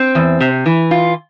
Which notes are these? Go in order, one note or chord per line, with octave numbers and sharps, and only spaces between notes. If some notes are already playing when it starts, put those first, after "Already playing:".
Already playing: C4
E2
C3
E3
F4